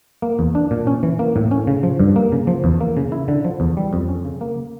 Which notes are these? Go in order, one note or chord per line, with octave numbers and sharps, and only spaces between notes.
A#3
E2
D4
A#2
C#4
E3
A#3
A2
C#4
C#3
F3
G2
A#3
C#3
F3
E2
A#3
C#3
E4
D3
F3
E2
G3
F2
C#4
C#3
A#3